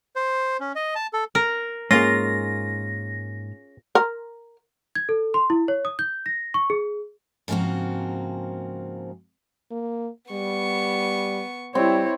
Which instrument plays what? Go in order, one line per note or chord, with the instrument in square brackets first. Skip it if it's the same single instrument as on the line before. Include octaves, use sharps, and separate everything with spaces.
[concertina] C5
C#4
D#5
A5
A4
[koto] A#4
[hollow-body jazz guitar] G#2 A#3 [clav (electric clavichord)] C#4 G#4 [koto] F4 [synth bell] A#6
[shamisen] A#4
[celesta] G#6
A4
C6
E4
C#5
D#6
G6
A#6
C#6
G#4
[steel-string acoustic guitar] G#2 C#3 F3 A#3 C4 F#4
[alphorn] A#3
[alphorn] G3 [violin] B3 C#6
[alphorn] G3 [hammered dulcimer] C4 [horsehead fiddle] E4 C#5